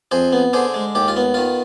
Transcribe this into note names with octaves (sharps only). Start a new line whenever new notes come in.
F2 G#4 C5
B3
D3 G#4 C5
G#3
D#2 G4
F4
B3
D#3 F4